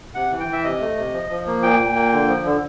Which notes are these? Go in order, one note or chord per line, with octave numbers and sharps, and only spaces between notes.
C3 F#5
E3
G5
E3
E5
C3 D#5
A3
C3
F3
F3
A#3
A#2 G5
A#2
A#3
D3
F3
D3